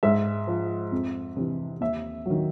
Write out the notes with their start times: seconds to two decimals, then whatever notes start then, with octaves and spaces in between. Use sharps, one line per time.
0.03 G#2 E5
0.47 F3
0.92 F2
1.37 C3 E3
1.81 D#2 E5
2.26 D#3 F#3